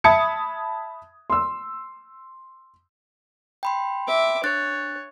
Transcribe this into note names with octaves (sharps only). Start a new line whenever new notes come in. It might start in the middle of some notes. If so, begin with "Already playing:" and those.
E5 A5 B5 D#6 G#6 C#7
C6 E6
G5 B5 C6
E5 D6
D4 C#5 F#6 A6